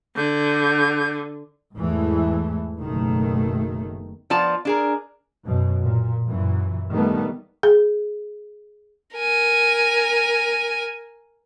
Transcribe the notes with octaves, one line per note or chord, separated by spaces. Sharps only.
D3 G6
E2 G#2 E3 A3
F#1 B2 D#3 A3
F3 B3 F4 D5 A5
D4 G#4 A#4
F#2 B2
A#2
F#2 A#2 E3
D#3 G3 A3 B3
G#4
A#4 G#5